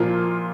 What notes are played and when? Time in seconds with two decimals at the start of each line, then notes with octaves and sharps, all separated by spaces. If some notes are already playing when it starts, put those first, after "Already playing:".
Already playing: A#2 F3 A#3 F4